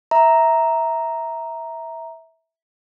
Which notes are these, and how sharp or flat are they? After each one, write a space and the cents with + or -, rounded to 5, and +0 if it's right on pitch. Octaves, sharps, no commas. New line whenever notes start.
E5 -15 A#5 +0